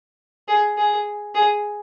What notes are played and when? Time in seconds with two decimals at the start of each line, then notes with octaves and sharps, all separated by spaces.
0.48 G#4
0.78 G#4
1.35 G#4